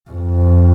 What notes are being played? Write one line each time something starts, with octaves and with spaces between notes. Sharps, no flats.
F2